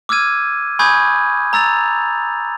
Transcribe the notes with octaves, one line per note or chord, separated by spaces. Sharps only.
D6 E6 F6 G#6 D#7
G#5 B5 C#6 D#6 G6 G#6
A#5 E6 A6 F7